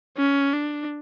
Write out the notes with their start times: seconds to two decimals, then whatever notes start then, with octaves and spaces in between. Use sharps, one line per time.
0.18 C#4
0.53 D4